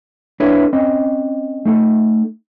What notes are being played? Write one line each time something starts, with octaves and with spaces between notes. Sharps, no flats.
D4 E4 A4 B4 C#5
C4 C#4 D#5
A3 D#4 A4